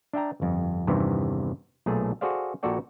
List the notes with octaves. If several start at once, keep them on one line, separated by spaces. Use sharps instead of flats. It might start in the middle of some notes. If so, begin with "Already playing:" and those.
D4 E5 G5 A#5
G1 F2
E2 G2 C3 D#3 E3
B1 A#2 A3 G#4
F#4 G#4 A4 C5 D5 F5
A#1 A#2 F#4 A4 D5 G5